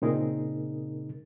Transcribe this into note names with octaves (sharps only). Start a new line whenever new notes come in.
A#2 C#3 C4 D#4 G#4 A#4